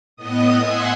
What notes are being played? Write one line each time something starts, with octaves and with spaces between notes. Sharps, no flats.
A2 B3 D#5 D#6
E5 F#5 G#5 C6